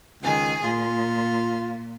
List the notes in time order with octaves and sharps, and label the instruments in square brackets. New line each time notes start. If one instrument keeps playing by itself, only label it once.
[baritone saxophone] C#2 [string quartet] D#3 G#4 G#5
[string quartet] A#2 [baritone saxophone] F4